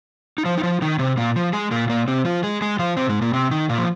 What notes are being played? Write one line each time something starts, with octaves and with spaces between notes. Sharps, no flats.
D#4
F3 F4
D#4
F3 F4
D#3 D#4
C3 C4
A#2 A#3
F3
G#3 G#4
A#2 A#3
A#2 A#3
C3 C4
F3 F4
G#3 G#4
G#3 G#4
F3 F4
C3 C4
G#2 G#3
A#2 A#3
C3 C4
D#3 D#4
A#2 A#3
F3